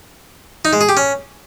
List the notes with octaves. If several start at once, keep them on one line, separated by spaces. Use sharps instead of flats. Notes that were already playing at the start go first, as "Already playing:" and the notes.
D#4
G#3
G#4
G4
C#4